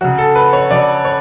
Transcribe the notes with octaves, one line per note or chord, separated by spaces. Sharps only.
C#3 F#3 F#4
A4
B4
C#5
C#3 F#3 D5
C#5